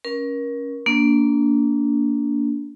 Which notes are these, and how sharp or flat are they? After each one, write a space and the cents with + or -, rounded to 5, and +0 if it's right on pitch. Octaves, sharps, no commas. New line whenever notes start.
C#4 +0 A#4 +30
A#3 +0 D4 -25